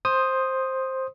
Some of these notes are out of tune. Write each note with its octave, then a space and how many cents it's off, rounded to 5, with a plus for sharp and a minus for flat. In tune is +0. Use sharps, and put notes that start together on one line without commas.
C5 +10 D#6 +0